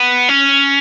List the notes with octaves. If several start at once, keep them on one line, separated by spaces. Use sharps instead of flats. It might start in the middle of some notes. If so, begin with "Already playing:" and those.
Already playing: B3
C#4